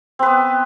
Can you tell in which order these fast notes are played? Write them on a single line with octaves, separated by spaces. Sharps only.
C4 B4 B3